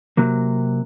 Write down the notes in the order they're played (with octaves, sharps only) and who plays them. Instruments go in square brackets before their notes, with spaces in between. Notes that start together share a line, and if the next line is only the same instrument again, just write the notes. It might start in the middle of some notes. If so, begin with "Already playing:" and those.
[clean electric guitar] C3 F#3 A#3